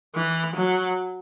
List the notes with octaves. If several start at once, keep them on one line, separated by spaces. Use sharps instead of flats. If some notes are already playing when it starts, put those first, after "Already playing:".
E3
F#3